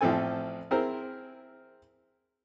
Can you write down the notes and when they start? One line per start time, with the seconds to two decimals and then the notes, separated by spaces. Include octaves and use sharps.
0.01 A1 F3 C4 A4 G#5
0.71 C4 E4 G#4 A#4 C5